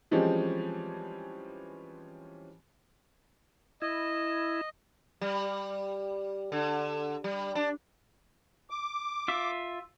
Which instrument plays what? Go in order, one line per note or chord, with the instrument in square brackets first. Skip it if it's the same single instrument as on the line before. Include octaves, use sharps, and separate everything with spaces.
[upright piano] E3 F3 G3 G#3 C4 C#4
[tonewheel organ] E4 [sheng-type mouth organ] D#5
[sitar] G3
D3
G3
D4
[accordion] D6
[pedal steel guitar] F4 E5